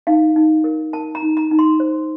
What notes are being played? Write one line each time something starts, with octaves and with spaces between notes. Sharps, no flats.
D#4 F5
D#4
A#4
A#4 A5
A#5
D#4
A#5
D#4
C6
C5